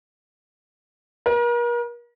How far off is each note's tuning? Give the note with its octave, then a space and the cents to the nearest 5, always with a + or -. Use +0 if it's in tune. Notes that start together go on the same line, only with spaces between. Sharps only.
A#4 +40